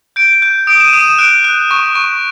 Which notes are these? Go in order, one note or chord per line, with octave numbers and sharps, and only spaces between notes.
G6 D7
G6
D#6 D7
E7
D#7
D#6
E7
F#6 D7
F#6
C#6
C#6